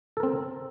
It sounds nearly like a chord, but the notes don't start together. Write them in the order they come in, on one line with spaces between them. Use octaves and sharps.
A4 A#4 C4